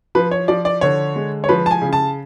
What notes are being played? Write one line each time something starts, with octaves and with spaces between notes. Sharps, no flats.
F3 B4
C#5
F3 D5
D5
D3 C#5
G#3
C#5
F3 B4
A5
G#5
C#3
A5